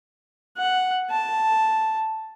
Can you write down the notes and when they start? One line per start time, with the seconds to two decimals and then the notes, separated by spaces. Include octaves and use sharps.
0.58 F#5
1.10 A5